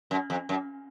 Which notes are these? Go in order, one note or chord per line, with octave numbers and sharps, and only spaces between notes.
F#2
F2
F#2